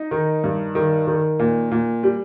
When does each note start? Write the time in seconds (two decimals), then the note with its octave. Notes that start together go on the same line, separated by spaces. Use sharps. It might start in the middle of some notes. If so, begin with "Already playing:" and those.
Already playing: D#4
0.11 D#3
0.44 G2
0.75 D#3
1.07 D#3
1.39 A#2
1.71 A#2
2.03 G3